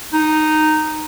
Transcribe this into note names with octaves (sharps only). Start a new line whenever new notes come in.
D#4